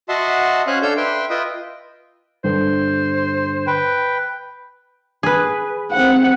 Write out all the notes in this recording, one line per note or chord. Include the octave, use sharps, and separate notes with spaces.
F#4 D#5 E5 F#5 A5 C6
C#4 C5 C#5 F5 G#5 F#6
D4 A4 F5 E6 G6
B4 E5 G5 C6
F4 B4 D#5 E5 G5 D#6
G2 D3 C5
B4 G5
G#4 B4
C4 F#5